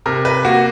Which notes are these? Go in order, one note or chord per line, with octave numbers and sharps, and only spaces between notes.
C3 A#4
B4
A#3 F#4